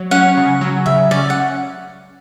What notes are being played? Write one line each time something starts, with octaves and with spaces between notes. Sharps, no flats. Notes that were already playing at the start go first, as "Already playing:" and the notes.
Already playing: F#3
C#4 F#5
C#3
F#3
C#3 E5
C#4 D5
F#5